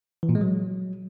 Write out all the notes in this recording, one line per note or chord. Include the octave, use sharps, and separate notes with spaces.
E3
A#2
G#3
F#3